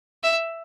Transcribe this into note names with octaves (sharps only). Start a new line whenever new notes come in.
E5